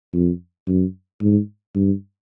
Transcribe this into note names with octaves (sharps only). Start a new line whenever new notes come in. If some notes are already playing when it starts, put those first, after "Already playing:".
F2
F#2
G#2
G2